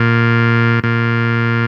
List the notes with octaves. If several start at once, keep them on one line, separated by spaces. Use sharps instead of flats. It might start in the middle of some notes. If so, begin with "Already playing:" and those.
Already playing: A#2
A#2